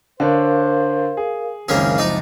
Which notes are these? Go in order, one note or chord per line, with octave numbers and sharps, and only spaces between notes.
D3 D4 A#4 C5 C#5 F5
G#4
F#1 C#2 D#3 A#3 C4 C#4 G#4
F3 D#4 D5